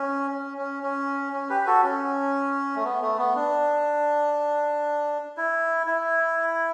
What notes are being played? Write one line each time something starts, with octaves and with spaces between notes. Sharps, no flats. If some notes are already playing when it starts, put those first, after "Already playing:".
Already playing: C#4
C#4
C#4
C#4
C#4
G4 B4
B4
F#4 A4
C#4
A3
B3
A3
B3
D4
E4
E4